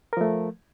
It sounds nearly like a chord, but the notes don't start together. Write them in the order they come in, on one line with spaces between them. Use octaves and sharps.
A#4 F3 A3